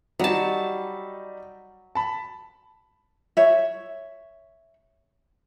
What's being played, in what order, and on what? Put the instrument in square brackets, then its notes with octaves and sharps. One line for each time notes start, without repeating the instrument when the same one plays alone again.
[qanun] F#3 A5 [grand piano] G3 D#4 D#5
[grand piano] A5 B5
[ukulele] C#5 E5